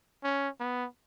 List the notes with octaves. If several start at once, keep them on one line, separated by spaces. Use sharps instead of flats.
C#4
B3